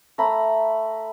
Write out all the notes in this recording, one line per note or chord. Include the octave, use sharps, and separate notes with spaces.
A3 A#5 B5